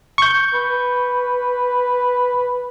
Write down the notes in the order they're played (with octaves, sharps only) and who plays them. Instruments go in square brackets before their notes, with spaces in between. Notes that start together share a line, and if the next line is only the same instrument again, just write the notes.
[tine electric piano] C#6 G6
[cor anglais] B4